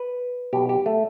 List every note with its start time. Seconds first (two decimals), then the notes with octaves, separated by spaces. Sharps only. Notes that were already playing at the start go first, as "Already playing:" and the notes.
Already playing: B4
0.53 B1 B2 G4
0.69 G4
0.86 A3